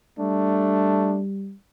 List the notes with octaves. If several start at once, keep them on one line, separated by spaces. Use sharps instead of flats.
G3 A3 D4